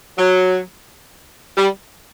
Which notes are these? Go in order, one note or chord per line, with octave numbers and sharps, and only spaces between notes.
F#3
G3